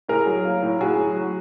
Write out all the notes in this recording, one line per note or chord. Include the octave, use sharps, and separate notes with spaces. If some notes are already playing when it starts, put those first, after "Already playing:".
A2 G#4 A#4
F#3
A#3
A2
A2 F#4 G#4
F#3
F#3